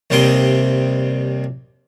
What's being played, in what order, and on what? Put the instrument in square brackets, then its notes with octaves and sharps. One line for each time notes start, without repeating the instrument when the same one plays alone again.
[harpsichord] D#2 C3 G3 D#5 C6